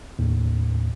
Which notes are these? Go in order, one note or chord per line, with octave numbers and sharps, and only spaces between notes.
D#2 A2